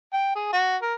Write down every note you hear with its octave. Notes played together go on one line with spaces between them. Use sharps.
G5
G#4
F#4
A#4